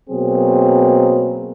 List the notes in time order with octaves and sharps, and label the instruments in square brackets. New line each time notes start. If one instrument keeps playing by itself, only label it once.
[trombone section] B2 F#3 A#3 C4 G#4